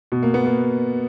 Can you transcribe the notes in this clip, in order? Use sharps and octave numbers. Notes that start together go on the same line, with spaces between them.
B2
A#3
B3
A#3